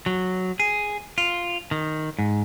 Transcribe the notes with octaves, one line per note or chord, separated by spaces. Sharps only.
F#3
G#4
F4
D#3
G#2